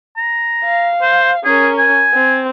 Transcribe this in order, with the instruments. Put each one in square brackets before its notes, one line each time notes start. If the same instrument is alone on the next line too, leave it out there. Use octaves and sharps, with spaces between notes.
[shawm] A#5
[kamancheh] F5
[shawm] C5
[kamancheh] C#4 A#4 [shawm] G#4
[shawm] G#5
[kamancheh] C4